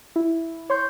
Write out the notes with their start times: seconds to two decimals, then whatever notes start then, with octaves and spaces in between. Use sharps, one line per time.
0.16 E4
0.70 C#5 C6 G6